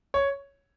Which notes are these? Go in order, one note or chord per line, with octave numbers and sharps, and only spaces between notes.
C#5